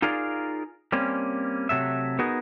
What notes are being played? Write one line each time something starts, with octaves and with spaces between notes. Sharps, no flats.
D#4 F4 G#4 A#4 D5 F5
G3 A#3 C4 C#4
C3 F#3 A3 E5
B3 D#4 F#4 G#4 A#4